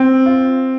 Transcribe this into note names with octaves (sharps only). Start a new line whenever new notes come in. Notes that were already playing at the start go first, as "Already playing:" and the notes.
Already playing: C4
F4